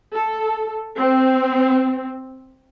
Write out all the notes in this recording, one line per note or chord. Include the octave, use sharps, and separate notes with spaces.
A4
C4